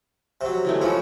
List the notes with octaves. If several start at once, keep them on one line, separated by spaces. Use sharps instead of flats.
C3 F#3
E3 G#3 A3
F3 C#4 E4 F#4